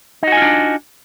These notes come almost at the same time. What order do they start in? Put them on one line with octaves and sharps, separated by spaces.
D#4 F#4 G#5 F4 D4